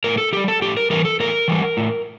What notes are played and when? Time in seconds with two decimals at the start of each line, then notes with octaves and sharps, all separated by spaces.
0.04 A2 A#4
0.18 A4
0.32 E3 G3 G4
0.48 A4
0.62 A2 G4
0.77 A#4
0.90 E3 G3 A#4
1.05 A4
1.20 A2 A#4
1.48 E3 G3
1.77 A2